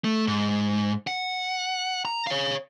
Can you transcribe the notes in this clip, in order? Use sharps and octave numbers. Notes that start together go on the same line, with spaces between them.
A3
G#2
F#5
A#5
C#5 F5